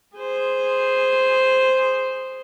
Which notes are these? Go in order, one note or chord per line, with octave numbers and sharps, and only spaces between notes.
G#4 C5